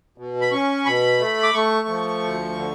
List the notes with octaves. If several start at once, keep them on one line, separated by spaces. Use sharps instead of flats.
B2
B5
C#4 C#6
B2 B5
A3
D6
A3 C#6
F3
D2
D3